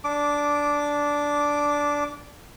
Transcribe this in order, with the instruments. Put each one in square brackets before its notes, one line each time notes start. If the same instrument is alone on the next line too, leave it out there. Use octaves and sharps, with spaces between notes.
[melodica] D4 D6